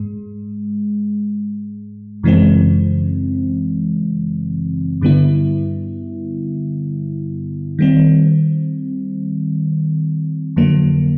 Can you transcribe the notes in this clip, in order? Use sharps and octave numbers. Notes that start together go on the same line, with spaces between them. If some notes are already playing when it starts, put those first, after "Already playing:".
Already playing: G#2 G#3
F#2 C#3 E3 G#3 C4
G2 D3 G3 B3 E4
D#3 G3 C4
F2 D3 F#3 A#3